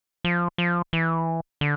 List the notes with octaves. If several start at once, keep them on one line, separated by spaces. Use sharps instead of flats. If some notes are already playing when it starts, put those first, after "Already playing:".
F3
F3
E3
D3